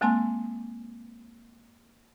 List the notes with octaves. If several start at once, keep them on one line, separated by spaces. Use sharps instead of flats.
G#3 A#3 C4 G#5 A5 C6